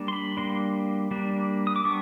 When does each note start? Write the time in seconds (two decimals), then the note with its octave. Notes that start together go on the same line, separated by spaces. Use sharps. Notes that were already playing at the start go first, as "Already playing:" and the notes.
Already playing: G3 A#3 D4
0.08 C6
0.13 B5
0.37 G3 A#3 D4 C6
1.11 G3 A#3 D4
1.67 D#6
1.76 D6
1.85 G3 B3 D4 C#6